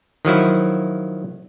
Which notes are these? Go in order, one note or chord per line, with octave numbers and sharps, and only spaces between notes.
D#3 F3 F#3 E4